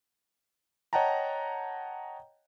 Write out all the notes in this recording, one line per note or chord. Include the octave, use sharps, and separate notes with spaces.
C#5 D#5 F#5 G5 A5 A#5